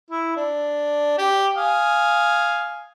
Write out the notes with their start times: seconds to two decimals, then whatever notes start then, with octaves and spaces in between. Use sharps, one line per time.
0.11 E4
0.37 D4
1.18 G4
1.56 F5 G#5 D#6